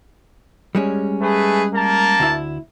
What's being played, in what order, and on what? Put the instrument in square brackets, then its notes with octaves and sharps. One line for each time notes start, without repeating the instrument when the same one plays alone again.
[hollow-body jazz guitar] G3 G#3 C#4
[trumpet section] A3 G#4 B4
A#3 A#4 A5
[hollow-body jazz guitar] D2 E4